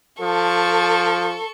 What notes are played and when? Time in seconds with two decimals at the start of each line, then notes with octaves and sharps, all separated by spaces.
0.20 F3 A4 C#6